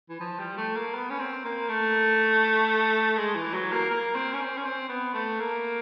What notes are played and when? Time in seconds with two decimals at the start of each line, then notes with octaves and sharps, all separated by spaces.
0.10 E3
0.20 F3
0.39 G3
0.57 A3
0.75 A#3
0.94 B3
1.10 C#4
1.19 C4
1.45 A#3
1.69 A3
3.17 G#3
3.35 E3
3.54 F#3
3.72 A#3
3.90 A#3
4.15 C4
4.33 C#4
4.41 C4
4.57 C#4
4.65 C4
4.89 B3
5.14 A3
5.40 A#3